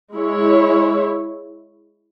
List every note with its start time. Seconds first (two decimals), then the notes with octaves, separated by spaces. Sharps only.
0.13 G#3 E4 C#5